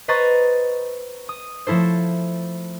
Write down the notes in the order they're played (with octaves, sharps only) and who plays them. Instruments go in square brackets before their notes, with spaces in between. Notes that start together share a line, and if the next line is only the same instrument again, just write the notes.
[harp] B4 C5 D#5 A#5 C#6 A6
D#6
F3 A3 E4 A4 C5